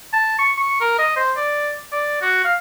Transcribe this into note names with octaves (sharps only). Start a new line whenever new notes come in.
A5
C#6
C#6
A#4
D#5
C5
D5
D5
F#4
F5